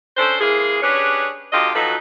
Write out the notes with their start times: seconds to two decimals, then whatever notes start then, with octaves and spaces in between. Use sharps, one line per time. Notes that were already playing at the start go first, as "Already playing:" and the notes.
0.17 C#4 D4 A4 C5
0.40 E3 G#3 A#3 G#4
0.82 C#4 D4 G4 G#4 B4 C#5
1.52 D3 F#3 F4 G4 D#5
1.75 F3 F#3 D#4 F#4 A4 B4